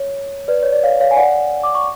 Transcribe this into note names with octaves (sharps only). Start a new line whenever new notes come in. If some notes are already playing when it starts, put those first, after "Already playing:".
Already playing: C#5
B4 D5
C#5
D5
C#5 F5
C#5 F5
G#5
D5 F#5
D6
C#6